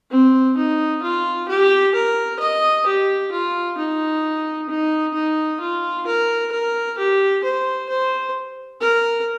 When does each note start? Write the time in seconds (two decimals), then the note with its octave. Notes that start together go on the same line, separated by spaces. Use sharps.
0.11 C4
0.57 D#4
1.03 F4
1.49 G4
1.95 A#4
2.40 D#5
2.86 G4
3.32 F4
3.78 D#4
4.69 D#4
5.14 D#4
5.61 F4
6.07 A#4
6.52 A#4
6.98 G4
7.44 C5
7.89 C5
8.81 A#4